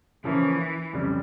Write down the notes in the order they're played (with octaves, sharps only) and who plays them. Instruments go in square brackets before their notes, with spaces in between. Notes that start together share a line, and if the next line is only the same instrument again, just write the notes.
[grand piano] C#3 F3 A#3 C#4 E4 [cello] E3
[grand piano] F2 C#3 G3